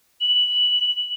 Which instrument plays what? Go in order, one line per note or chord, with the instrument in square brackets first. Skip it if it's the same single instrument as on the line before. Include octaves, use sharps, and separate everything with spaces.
[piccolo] F#7